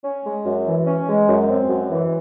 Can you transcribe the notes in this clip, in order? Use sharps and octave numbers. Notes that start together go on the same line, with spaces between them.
C#4
G#3
F#2
E3
C#4
G#3
F#2
C4
F#2
E3